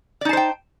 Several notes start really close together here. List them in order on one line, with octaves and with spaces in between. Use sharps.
D5 D#4 A5 C5 G5